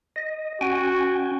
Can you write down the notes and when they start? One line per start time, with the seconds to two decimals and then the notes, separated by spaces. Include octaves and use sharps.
0.16 D#5
0.61 C#4 F#4 G5 G#5